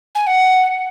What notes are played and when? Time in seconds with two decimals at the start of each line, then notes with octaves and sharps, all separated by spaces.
0.15 G#5
0.27 F#5